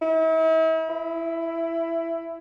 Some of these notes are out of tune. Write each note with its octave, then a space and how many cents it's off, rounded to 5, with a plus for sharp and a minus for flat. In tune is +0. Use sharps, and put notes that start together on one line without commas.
E4 -40
E4 +10